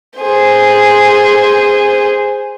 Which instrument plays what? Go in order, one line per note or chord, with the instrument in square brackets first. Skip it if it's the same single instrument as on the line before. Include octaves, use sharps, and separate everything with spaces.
[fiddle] G#4 C5